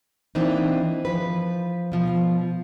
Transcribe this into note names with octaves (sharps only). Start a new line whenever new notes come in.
E3 A#3 C4 D4 D#4
F3 B4
B2 F3